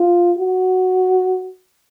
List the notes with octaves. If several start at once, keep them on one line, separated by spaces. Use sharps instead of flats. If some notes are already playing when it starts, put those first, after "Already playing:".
Already playing: F4
F#4